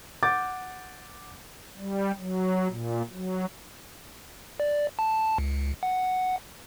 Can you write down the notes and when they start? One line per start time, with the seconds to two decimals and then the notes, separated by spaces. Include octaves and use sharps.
0.23 F#5 D6 G6 A6
1.77 G3
2.18 F#3
2.68 A#2
3.11 F#3
4.60 D5
4.99 A5
5.38 C#2
5.83 F#5